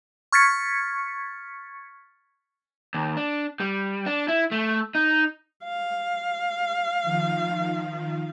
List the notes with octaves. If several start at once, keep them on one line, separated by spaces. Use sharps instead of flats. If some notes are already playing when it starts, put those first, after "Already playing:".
C#6 F6 G#6 A6 B6 C#7
D#2
D4
G3
D4
E4
A3
D#4
F5
D#3 F3